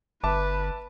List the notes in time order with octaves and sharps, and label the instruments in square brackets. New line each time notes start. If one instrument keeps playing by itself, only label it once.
[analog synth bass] G1 [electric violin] B4 [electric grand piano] E5 A5 D6